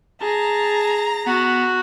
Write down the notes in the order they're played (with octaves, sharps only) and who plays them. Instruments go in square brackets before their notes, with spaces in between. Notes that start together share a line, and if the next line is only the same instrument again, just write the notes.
[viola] G#4 [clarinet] A5 [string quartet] A#5
[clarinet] B3 [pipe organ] F#4